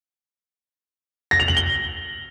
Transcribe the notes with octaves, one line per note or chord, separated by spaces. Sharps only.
A#6
F7
F#7
G7